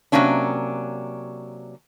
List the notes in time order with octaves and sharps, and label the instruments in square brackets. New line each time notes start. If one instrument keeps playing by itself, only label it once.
[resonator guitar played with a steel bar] C3 D#3 F#3 A#3 C#4 D4